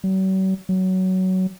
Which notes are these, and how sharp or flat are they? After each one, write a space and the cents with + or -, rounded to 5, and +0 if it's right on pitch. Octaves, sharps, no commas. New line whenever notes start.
F#3 +45
F#3 +15